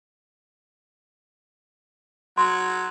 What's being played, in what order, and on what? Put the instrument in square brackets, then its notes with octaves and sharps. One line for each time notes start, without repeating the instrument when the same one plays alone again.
[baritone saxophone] F#3 [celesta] C6